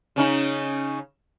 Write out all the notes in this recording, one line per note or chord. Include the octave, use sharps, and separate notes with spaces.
C#3 C#4 D#4